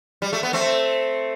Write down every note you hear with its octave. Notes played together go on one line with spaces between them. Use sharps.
G3
A3
B3
A3 C4